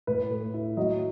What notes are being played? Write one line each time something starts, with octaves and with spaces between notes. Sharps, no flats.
A2 B4
A3
E4
F#3 D#5